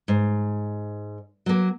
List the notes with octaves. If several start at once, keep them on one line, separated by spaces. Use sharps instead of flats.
G#2
F#3 A#3